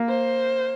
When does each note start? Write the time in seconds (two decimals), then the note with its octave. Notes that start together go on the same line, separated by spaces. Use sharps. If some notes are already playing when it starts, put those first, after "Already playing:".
Already playing: A#3
0.09 C5